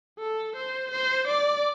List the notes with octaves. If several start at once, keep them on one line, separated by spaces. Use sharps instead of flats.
A4
C5
C5
D5